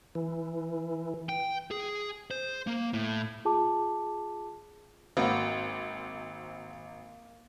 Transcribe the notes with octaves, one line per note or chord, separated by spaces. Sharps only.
E3
G5
G#4
C5
A#3
A2
F4 G#4 A5 D6
G#1 A#3 C4 F#4 B5